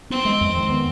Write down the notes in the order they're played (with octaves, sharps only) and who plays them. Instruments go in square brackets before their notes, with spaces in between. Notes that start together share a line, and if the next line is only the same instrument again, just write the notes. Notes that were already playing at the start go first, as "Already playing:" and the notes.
[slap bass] B3 [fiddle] C4
[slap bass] G#3
F2
D#3
B3